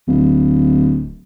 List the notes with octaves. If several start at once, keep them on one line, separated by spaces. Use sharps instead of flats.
D1